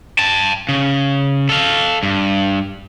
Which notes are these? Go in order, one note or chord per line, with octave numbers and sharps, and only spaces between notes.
G5 A5
C#3
A4 F5
G2